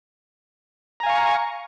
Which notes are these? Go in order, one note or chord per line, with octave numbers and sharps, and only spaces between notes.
F5 G#5 A#5 C#6